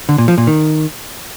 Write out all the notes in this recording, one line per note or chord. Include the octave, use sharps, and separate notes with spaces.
D3
A#2
F3
A#2
D#3